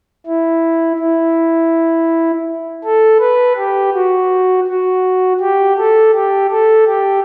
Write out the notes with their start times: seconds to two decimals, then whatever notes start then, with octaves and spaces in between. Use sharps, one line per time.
0.27 E4
0.99 E4
2.84 A4
3.20 B4
3.57 G4
3.94 F#4
4.67 F#4
5.40 G4
5.78 A4
6.14 G4
6.51 A4
6.87 G4